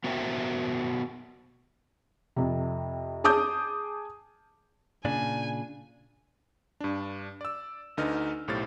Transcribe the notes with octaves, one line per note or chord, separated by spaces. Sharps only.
B3 F#4 A#4 C5 E5 G5
F2 C3
G#4 A5 D6 D#6 G6
A#2 C#3 D4 G#5
G2 D4
D5 E6
D2 D3 D#4 B4 D#5 F6
B1 A2 G4 C5 A6